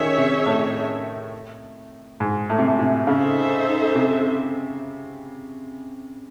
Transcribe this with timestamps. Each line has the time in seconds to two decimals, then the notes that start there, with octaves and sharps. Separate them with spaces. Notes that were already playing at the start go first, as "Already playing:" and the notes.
Already playing: D#3 C#4 G#4 C#5 E5
0.18 C3
0.46 A2
2.20 G#2
2.50 A2
2.59 C3
2.68 A2
2.79 C3
3.07 C#3 D#4 A4 C5 E5
3.95 C3